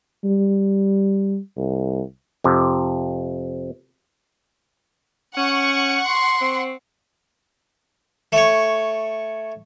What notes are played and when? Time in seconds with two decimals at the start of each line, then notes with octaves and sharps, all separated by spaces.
0.24 G3
1.57 C2
2.44 F2 C3
5.37 C#4 F#5 C#6
6.07 C6
6.41 C4
8.32 A3 C#5